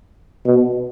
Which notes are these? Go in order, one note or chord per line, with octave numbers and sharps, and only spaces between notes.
B2